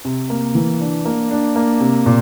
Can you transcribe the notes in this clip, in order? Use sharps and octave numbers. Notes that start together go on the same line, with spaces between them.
C3
A#3
E3
D4
A#3
D4
A#3
C3
A#2